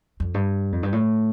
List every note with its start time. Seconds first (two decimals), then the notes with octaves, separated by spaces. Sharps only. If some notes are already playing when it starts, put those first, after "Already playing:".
0.20 F2
0.34 G2
0.72 F2
0.83 G2
0.92 A2